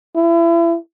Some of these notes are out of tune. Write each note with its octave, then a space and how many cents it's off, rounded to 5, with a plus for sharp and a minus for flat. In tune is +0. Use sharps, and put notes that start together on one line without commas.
E4 +35